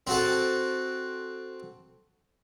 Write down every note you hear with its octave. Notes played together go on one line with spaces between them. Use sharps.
C4 F#4 A4